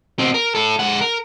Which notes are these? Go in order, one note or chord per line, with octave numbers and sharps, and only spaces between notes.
B2 C4
A#4
E4 A4
G#3 F#5
A#4